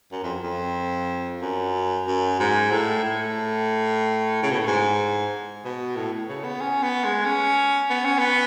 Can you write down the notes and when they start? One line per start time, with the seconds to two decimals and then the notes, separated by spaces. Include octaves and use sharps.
0.12 F#2
0.23 F2
0.43 F2
1.42 F#2
2.07 F#2
2.40 G#2
2.71 A2
3.04 A2
4.43 C#3
4.51 B2
4.59 A2
4.67 G#2
5.64 B2
5.96 A2
6.29 C#3
6.44 B3
6.61 C#4
6.83 B3
7.05 G#3
7.25 C#4
7.90 B3
8.05 C#4
8.18 B3